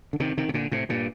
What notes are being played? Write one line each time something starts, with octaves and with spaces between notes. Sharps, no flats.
D3
C3 D#3
C3 D#3
C3
A#2 D3
A2 C3
G2 A#2